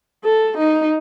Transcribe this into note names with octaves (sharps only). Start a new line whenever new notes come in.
A4
D#4